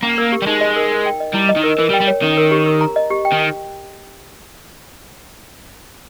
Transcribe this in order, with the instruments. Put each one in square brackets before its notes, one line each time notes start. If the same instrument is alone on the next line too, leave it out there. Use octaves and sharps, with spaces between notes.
[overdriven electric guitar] A#3 [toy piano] C#4
[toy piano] A#4
G4
[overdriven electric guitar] G3
[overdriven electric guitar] G#3 [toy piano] D#4
[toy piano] D#5
A#4
A#4
G5
D#5
[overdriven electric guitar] G3 [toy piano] E4
[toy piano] D#5
[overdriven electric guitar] D#3
[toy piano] A#4
[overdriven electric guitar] E3 [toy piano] A#4
[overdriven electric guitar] G3
[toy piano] G5
[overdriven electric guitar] G3
[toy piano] C#5
[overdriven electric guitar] D#3 [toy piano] C#4
[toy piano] A#4
G4
A#4
A#5
D#5
G4
G5
[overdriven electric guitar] D#3